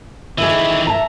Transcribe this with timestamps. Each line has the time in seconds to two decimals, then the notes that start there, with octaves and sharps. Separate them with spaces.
0.38 D#3 E3 G#4 B4 E5
0.87 E5 A5 A#5